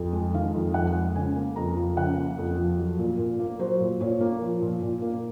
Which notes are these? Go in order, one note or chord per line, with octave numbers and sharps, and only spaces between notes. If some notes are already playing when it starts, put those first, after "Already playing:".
Already playing: F2
G#3
D#3 F5
F2
F2 F#5
G#3
C#3 G#5
A#3
F2 A#5
F3
C#3 F#5
A#3
F2
F3
F#3
A#2
A#2
A#3
F#3 C5
A#2
A#2 C#5
A#3
F3
A#2
A#2
A#3